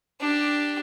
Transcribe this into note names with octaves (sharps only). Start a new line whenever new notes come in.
D4 G4